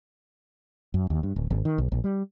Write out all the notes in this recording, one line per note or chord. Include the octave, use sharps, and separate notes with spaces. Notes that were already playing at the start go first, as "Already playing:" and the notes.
F#2
D#2
G2
D1
G#1
D#3
B1
A#1
G3